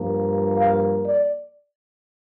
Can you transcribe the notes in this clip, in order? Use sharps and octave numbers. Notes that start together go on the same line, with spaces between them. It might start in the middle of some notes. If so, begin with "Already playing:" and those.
Already playing: G2 F3 A#3
F5
D5